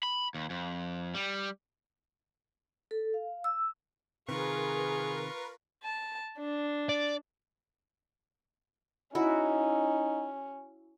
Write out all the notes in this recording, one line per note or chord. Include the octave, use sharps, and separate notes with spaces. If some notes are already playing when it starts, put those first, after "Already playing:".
B5
D#2
F2
G3
A4
F5
E6
C3 D#3 F4 G#4 A#4 B4 C#6
A5
D4
D5
C#4 D#4 E4 F#4